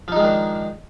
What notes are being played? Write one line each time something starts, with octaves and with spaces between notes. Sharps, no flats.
D#3 F3 G#3 D4 D#4